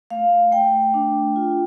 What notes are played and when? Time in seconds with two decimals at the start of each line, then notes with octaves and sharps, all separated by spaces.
0.10 A3 F5
0.52 A3 G5
0.94 D4
1.36 F4